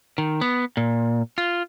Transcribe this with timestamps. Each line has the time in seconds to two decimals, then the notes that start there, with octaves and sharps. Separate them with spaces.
0.18 D#3
0.41 B3
0.77 A#2
1.38 F4